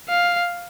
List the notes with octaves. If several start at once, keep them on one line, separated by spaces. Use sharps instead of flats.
F5